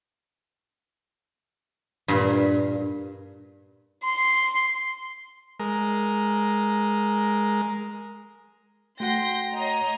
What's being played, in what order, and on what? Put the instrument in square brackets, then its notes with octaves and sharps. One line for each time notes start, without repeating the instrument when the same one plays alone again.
[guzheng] G2 A#2
[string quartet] C6
[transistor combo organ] G#3 A#4
[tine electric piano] A3 F#4 F#5 [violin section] G5 C6 A#6
[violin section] C#5 D#5 A#5